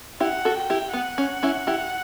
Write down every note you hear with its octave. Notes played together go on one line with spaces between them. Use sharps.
E4 G4 F#5
F#4 A4
G5
E4 G4
B3 F#5
C#4
C#4 E4
E4 G4